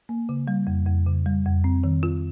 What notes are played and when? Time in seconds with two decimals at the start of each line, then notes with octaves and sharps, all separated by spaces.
0.09 A#3
0.29 C#3
0.48 G3
0.67 F2
0.86 F2
1.06 C#3
1.26 G3
1.46 F2
1.64 C4
1.84 D#3
2.03 F4